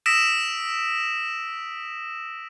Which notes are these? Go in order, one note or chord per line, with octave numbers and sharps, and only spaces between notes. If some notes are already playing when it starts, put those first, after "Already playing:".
D#6 E6 A#6 B6 D7 E7